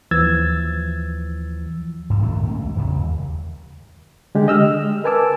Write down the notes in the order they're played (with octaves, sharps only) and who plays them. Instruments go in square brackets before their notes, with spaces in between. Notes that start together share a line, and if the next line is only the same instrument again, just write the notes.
[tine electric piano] D#2 E3 F3 E6 G#6 A6
[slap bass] G2
A2 D#3 A3 B3
B1 G#3 A#3 C#4
D2
F1 E2 C#3 G3
D#2
[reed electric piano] D3 G#3 G4
D#5 E6 F6
A#4 B4 G#5 A5 D6 E6